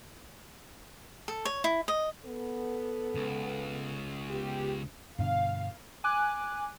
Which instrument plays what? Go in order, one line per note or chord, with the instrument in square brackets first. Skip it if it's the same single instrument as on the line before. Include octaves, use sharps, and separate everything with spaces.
[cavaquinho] A4
C#5
E4
D#5
[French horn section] B3 A4
[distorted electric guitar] C#2
[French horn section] B3 G4
[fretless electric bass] G2 B2 D3 [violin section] F5
[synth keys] G#5 D6 F#6